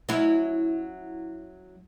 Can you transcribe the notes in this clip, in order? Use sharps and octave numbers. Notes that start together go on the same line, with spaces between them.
F#3 C#4 E4